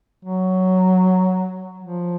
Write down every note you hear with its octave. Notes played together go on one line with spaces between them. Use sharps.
F#3
F3